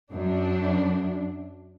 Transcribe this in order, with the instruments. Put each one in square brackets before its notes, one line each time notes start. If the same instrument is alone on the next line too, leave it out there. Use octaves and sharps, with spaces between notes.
[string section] F#2 D4